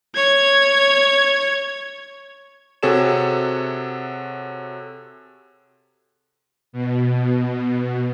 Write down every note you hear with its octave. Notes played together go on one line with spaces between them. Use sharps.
C#5 G#6
C3 F#4 G#4 A4 C#5 E7
B2